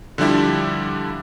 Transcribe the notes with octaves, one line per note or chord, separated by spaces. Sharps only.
D3 F3 G3 D4 E4 G4